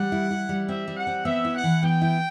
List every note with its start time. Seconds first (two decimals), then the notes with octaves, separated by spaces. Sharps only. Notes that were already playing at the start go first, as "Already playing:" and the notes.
Already playing: G3 F#5
0.12 E4
0.31 E4
0.49 G3
0.69 C4 E5
0.88 G3
0.97 F#5
1.07 C4
1.25 B3 E5
1.45 E4
1.54 F#5
1.64 E3
1.83 B3 G5
2.02 E4